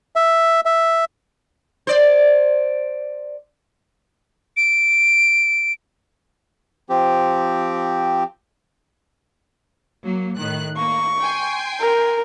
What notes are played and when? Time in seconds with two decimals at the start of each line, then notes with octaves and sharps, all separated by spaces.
0.16 E5
0.65 E5
1.87 C5 D5
4.57 D7
6.90 F3 C4 G4
10.03 F#3 A#3
10.38 A2 D#3 F#6
10.77 A#3 C#6
11.20 G5 G#5 C6
11.80 A#4